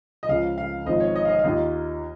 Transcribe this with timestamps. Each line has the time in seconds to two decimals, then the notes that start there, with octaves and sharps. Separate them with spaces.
0.23 D#5
0.28 C#2 C#3 F3 F5
0.58 F5
0.86 G#1 G#2 F3 D#5
1.00 C#5
1.16 D#5
1.25 F5
1.29 D#5
1.39 F5
1.44 D#2 D#3 A#3 F4 D#5